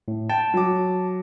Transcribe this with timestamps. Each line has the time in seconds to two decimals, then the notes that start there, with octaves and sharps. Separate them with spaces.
0.08 A2
0.29 G5 A5
0.54 F#3 D6